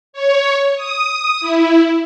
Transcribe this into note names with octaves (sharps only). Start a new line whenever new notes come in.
C#5
D#6
E4